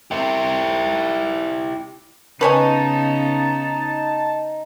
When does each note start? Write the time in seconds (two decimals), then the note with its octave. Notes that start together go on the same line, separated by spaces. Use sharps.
0.11 E4 G4
2.41 C#3 B3 D#4 B4 C#5 G#5 A5